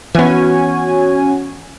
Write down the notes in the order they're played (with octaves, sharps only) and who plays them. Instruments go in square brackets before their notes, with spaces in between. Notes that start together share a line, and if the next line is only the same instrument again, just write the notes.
[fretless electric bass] E3 B3 [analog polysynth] C#4 F#4 G#5